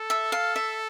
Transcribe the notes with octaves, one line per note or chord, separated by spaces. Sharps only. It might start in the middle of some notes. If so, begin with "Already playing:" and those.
Already playing: A4
E5
F5
E5